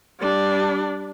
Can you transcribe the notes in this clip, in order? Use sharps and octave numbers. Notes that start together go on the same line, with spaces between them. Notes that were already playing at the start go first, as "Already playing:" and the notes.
G3 D4